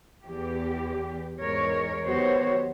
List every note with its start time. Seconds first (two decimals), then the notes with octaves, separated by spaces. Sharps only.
0.24 E2 G4
1.40 E2 G#2 G#3 A#4 C#5
2.05 D#2 F#3 B3 F#4 C5 C#5